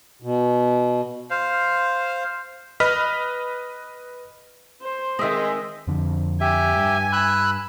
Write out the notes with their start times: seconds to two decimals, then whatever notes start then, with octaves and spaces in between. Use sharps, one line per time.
0.22 B2
1.30 C5 F5
2.80 B4 D#5 B5 F6 B6
4.81 C5
5.19 D#3 G#3 C4 D#5 E5
5.87 F2 D3 F3
6.41 G4 E5 G#5
6.76 G2
7.13 B5 E6 F#6